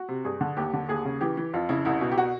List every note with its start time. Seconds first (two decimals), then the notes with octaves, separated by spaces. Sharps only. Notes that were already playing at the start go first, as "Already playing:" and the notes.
Already playing: F#4
0.09 C3
0.24 G2 G#4
0.41 D3
0.57 D#2 G4
0.73 D3
0.89 D#2 G#4
1.05 C#3
1.21 E3 G4
1.37 E3
1.54 F2 F4
1.69 C#3 E4
1.85 C2 E4
2.01 B2
2.12 G4
2.18 F#4